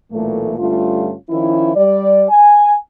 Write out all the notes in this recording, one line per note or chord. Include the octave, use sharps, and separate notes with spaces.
B1 A#2 E3 A3
G2 D3 G3 A3 C#4 F4
D#3 F3 C#4 E4
G3 D5
G#5